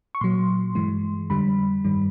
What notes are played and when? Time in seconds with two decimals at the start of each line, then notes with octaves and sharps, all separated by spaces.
0.15 C#6
0.21 A#2 F#3 C6
0.75 G2 E3 G#3
1.30 F2 D3 G3 B5
1.84 G2 D#3 G3